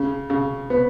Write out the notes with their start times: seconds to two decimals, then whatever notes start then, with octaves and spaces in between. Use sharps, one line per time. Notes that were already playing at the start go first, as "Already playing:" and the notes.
Already playing: C#3
0.30 C#3
0.70 B3